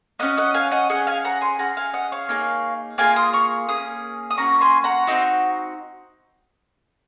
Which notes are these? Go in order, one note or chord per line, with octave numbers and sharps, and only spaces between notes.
A#3 C#4 F#4 D#5 F#5
D#5 F#5
F5 G#5
D#5 F#5
C#4 G#4 D#5 F#5
F5 G#5
F#5 A#5
G#5 C6
C#4 G#4 F#5 A#5
F5 G#5
D#5 F#5
C#5 F5
A#3 D#4 G#4
A#3 F4 G#4 F5 G#5
C6 D#6
A#5 C#6
A#3 C#4 G#4 D#6
D#6
A#3 C#4 F#4 A#5 C#6
G#5 C6
F#5 A#5
C4 D#4 F#4